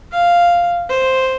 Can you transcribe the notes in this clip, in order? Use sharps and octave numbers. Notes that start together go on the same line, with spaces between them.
F5
C5